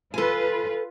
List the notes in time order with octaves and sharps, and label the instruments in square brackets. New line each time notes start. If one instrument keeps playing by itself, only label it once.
[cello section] F4 B4 [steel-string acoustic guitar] A4 G#5